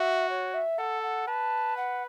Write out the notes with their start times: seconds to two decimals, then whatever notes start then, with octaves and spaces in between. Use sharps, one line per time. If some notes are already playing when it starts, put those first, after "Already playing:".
Already playing: F#4 E5
0.29 C#5
0.53 E5
0.78 A4 F#5
1.03 F#5
1.27 B4 A5
1.76 F#5